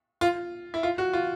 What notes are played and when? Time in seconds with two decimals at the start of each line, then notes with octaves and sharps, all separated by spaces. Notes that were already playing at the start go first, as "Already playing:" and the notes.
0.21 F4
0.74 E4
0.83 F4
0.98 F#4
1.13 F4